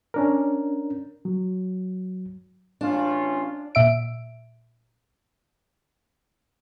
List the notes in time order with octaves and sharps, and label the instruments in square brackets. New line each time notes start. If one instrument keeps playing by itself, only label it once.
[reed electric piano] C#4 D4 A#4
F#3
[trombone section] A1 C#4 F4 [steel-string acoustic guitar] D4
[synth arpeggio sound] A#2 E5 D7